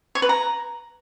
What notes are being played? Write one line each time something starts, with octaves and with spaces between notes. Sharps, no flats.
C#5
B4
A#5